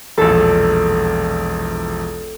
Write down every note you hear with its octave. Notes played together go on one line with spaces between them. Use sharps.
E1 A#1 A4